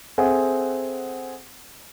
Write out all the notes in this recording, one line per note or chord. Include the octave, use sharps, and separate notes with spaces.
C4 G#4 A4 E5 F#5